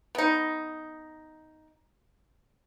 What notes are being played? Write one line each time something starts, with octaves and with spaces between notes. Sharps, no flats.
B3 D#4